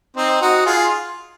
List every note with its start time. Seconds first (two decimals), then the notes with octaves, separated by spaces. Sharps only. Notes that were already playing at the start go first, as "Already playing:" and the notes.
0.16 C4 D#4
0.41 D#4 F#4
0.66 F4 G#4